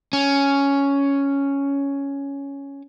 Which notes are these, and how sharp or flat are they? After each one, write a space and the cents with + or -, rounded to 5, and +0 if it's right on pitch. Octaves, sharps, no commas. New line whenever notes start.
C#4 +5